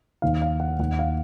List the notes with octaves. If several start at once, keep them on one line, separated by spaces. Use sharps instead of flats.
D#2 D#3 F5
F5
F#5
D#2 D#3 F#5
F5